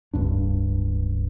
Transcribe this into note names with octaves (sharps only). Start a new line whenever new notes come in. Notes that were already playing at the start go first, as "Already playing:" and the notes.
D1 C#2 G2 D4